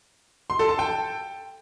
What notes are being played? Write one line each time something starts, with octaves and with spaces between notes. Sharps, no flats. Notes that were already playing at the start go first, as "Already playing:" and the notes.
C6
A4
A5
G5